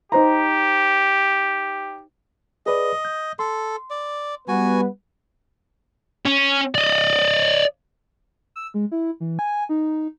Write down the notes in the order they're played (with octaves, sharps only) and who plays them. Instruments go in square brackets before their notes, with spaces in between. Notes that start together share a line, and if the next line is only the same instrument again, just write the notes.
[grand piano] D#4 C5 A#5 [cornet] G4
[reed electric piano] G#4 B4 D5 [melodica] D#5
[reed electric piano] G6
[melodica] A4 [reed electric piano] C6
[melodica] D5
[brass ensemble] G3 B3 B4 [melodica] F#4 G#5
[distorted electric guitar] C#4
D5 D#5
[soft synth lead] E6
G#3
E4
E3
G#5
D#4